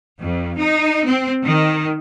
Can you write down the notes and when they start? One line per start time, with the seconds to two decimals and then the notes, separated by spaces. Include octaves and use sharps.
0.20 F2
0.57 D#4
1.06 C4
1.44 D#3